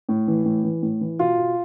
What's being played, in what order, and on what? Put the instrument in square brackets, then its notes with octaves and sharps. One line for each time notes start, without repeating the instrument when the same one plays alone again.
[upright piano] A2
E3
A2
E3
A2
E3
B2 F4
B2